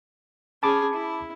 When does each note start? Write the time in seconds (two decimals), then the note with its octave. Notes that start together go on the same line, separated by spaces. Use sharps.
0.63 C#4 G#4 A5 B5 D6
0.94 E4